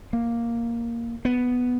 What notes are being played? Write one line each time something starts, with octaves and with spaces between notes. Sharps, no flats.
A#3
B3